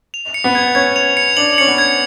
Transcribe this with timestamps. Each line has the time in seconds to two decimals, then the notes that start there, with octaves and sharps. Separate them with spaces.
0.14 F7
0.34 C#7
0.44 B3
0.55 G#6
0.75 C#4 G#6
0.96 F7
1.17 C#7
1.37 D4 F#7
1.58 C#4 C#7
1.68 B3
1.78 G#6